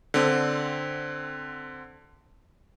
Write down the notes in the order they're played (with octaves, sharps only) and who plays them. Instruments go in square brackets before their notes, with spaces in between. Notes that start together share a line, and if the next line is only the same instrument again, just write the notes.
[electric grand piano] D3 C4